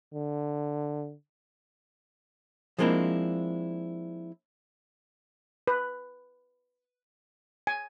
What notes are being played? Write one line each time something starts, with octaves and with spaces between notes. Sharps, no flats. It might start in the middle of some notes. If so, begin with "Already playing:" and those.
D3
F3 G#3 A#3 C4 D4 E4
B4
G#5